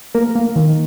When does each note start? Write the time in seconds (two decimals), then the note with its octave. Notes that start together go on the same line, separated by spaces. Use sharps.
0.15 A#3 A#4
0.35 A#3
0.56 D#3